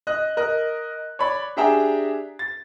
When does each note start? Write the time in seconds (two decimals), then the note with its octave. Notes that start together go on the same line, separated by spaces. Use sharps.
0.07 D#5 F#6
0.37 A#4 D#5 F#6
1.19 C#5 D5 B5
1.57 D4 G4 G#4 E5 G5 A#5
2.39 A6